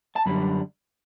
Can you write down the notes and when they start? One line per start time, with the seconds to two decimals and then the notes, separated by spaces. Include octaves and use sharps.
0.16 A5
0.26 F#2 D3 G3 D4 B5